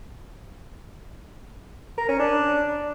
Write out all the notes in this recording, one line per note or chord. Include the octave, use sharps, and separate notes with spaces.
A#4
C#4
D4